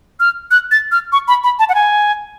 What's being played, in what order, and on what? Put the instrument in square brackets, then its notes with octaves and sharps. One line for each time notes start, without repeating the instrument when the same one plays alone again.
[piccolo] F6
F#6
A6
F6
C#6
B5
B5
A5
F#5
G#5